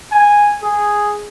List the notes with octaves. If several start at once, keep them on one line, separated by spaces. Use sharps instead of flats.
G#5
G#4